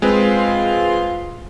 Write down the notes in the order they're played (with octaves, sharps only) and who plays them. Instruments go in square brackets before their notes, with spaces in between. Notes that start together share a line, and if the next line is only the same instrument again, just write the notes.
[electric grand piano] G#3 C4 B4 [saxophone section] F4